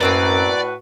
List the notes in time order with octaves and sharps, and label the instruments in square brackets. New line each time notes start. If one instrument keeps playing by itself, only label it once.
[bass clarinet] F#2 [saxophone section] A2 F#4 B4 [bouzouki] A#3 C4 A#4 [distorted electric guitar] D5